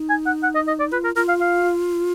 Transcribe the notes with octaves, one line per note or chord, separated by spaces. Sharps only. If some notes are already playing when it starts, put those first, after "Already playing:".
Already playing: D#4
G#5
F#5
F#5
D#5
D#5
D5
F4 B4
A#4
F4 A#4
F5
F5